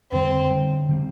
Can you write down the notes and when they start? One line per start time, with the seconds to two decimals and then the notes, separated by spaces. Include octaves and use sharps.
0.11 F2 D3 G3 C4
0.50 D3 G3 C4
0.89 D3 G3 C4